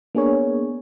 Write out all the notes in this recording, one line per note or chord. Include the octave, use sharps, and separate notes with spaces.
A#3 B3 D4 G#4 A#4 C#5